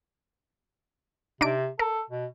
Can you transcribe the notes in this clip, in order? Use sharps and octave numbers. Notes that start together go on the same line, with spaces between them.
C3 D4 D#4 D7
A4 A#4
B2